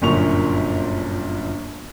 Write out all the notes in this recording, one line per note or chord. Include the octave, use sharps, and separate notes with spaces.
G1 F#2 A#2 C#6 F7